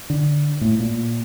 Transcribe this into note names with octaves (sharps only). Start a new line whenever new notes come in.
D3
A2
A#2